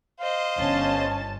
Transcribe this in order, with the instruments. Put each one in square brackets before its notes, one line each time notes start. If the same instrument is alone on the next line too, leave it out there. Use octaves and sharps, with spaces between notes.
[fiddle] C5 D#5 [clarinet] F5
[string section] G1 C#4 A5